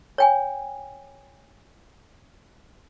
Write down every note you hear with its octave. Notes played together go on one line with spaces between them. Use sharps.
C#5 G5 G#5